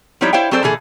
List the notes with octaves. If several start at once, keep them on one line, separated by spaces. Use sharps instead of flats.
F3 G3 D#4 E4 C#5 D5
E4 C5 C#5 F5 G5
F#3 C4 G#4 A4 C5 D5
A#2 D3 E3 G#4 A4